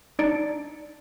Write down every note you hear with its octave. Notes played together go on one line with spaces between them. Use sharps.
D4 D#4 D5 A6 C#7 D7